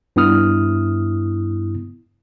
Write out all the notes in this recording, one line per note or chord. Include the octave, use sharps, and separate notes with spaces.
G2 B3 E4 D#6 F6